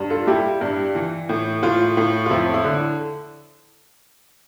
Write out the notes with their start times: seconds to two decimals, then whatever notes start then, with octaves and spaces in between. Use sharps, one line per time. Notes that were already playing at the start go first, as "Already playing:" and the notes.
Already playing: G2
0.10 F4 A4
0.27 G3 E4 G4
0.61 G2
0.95 E3
1.29 A2
1.63 A2 F4
1.97 A2
2.26 F4
2.30 F2 E4
2.54 E4
2.64 D3